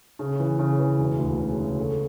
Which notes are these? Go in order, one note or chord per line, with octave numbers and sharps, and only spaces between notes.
C#3
E3
C#3
E3
E1
D2
C#3
C#3
A3